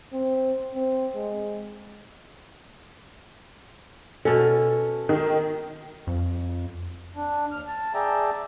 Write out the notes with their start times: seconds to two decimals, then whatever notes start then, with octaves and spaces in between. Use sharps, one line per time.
0.13 C4
0.74 C4
1.15 G#3
4.25 B2 C#4 A4 F6
5.09 D#3
6.07 F2
7.16 D4
7.52 D#2 F6
7.67 A5
7.94 G#4 D5 E5 G5 A5 A#5